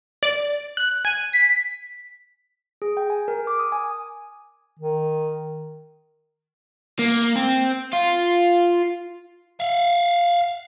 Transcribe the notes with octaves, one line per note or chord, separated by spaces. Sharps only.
D5
F#6
G#5
B6
G#4
G5
G#5
A#4
D6
D#6
G#5
D#3
A#3
C4
F4
E5 F5